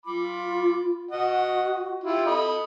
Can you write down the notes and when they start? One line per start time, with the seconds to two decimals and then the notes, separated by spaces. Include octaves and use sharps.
0.06 F4 B5 D6
1.11 F#4 D#5 F#5
2.04 E4 F4 G4
2.26 A4 D#5 B5